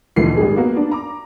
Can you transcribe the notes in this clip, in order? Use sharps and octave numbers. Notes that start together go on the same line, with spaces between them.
F1 D2 A#2 E3 C7
G#1 G3 G#3 G#4
A#3 B3 F#4
D4
A#5 D6